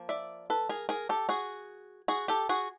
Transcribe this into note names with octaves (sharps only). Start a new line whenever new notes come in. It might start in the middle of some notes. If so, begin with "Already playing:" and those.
Already playing: F3 A#3
D5 E5
A4 B4
G#4 A#4
G#4 A#4
G4 A4
F#4 G#4
F#4 G#4
G4 A4
F#4 G#4